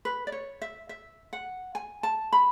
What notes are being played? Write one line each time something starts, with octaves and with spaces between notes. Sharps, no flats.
B4
D5
C#5
E5
E5
F#5
G#5
A5
B5